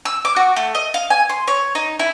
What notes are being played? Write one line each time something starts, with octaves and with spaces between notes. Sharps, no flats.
E6
D6
F#4
A3
D#5
F5
G#5
C6
C#5
D#4
E4